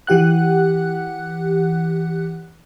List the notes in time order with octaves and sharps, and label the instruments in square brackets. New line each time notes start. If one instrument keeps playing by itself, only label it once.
[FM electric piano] E3 G4 F#5 F#6